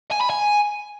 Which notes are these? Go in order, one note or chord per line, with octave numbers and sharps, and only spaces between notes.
G#5
B5
G#5